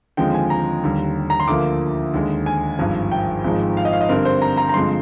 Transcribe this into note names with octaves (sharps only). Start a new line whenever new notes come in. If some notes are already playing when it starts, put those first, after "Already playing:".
D#2 D3 F3 G#3 C4 G5
G#5
A#5
D#2 D3 G3
A#5
C6
D2 D3 F3 A#3 D6
D#2 D3 G#3
G#5
G#1 G2 F3
G5
G#1 G#2 F3 G#3
F5
D#5
F5
D#5
G2 D3 G3 C4 A#4
C5
A#5
A#5
A#5
G2 D3 F3 G#3 C4 C6